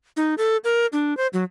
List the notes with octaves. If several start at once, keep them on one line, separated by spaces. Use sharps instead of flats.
D#4
A4
A#4
D4
C5
F#3